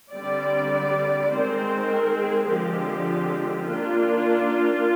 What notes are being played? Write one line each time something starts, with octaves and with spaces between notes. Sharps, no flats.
D3 G3 C4 D5
D#3 G#3 C4 C5
A#4
G#4
D3 F3 G#3 C4 G4
D#3 A#3 D4 F4